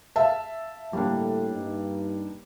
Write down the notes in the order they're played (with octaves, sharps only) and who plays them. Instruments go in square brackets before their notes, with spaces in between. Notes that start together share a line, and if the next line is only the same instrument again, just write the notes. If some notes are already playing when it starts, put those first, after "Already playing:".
[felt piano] E5 F5 A5
[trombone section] A2 D3 [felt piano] G3 A#3 D4
[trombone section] G2 D#4